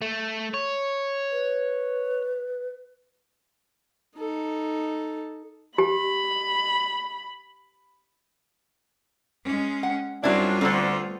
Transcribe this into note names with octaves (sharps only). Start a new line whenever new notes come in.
A3
C#5
B4
D#4 A4
G4 B5
G#3 C#4
F#5
F#2 F#3 G3 C4 D4 E4 F4
D2 D3 A3 B3 C4